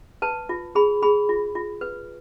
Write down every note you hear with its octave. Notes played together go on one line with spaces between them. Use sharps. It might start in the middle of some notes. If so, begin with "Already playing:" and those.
B4 A5
F4
G#4 B5
G#4 B5
F4
F4
B4